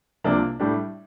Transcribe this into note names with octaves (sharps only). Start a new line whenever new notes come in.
C2 C3 F3 A#3 D4
A2 G3 D4